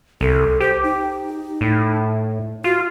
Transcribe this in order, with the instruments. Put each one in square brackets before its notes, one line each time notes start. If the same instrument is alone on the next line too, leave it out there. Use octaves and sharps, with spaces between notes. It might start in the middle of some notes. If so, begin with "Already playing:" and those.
[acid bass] C2 [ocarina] A4
[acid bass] G4 [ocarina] C5
[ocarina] D#4
[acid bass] A2
[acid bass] F4 [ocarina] F#4